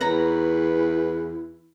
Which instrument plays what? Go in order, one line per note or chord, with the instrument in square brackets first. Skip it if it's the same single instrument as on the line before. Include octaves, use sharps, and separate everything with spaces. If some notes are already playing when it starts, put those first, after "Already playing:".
[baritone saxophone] E2 [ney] E4 [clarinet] B4 [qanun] C#5 A#5 B5